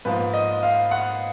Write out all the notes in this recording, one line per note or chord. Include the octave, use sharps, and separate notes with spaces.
G#2 F3 A#3 B4
D#5
F5
F#5